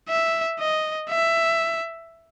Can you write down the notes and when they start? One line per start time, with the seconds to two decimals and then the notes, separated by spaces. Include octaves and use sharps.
0.09 E5
0.59 D#5
1.09 E5